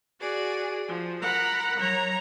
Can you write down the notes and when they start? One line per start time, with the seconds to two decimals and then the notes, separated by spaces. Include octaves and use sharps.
0.20 F#4 G#4 D5
0.87 F3
1.22 A#4 F#5 A#5 B5
1.78 F#3 C#5 A#5